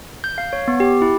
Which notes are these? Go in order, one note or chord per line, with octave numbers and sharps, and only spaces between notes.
G6
F5
C#5
B3
G4
E4